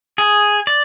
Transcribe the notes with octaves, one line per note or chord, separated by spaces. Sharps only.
G#4
D5